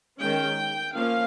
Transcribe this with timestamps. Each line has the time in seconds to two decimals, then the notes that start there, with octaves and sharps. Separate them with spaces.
0.20 D#3 G#3 C#4 G5
0.95 F3 A#3 C#4 F5